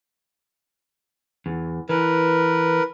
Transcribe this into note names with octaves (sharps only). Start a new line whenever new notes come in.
E2
E3 A#4 B4